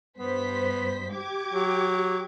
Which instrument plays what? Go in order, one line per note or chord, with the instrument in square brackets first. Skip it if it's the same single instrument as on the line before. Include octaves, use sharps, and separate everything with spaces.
[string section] G2 C5 B6 [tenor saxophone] B3
[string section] G4 D6 G#6
[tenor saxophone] F#3